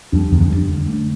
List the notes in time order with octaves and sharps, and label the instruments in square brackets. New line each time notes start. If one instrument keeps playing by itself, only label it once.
[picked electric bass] F2 [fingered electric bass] G3 A#3 D4
[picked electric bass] E2 [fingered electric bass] D3
[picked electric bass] F2
[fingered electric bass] G3 A#3 D4
D3
A3 D4